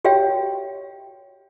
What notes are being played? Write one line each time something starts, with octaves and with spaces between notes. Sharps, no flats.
F#4 G4 C#5 E5 G5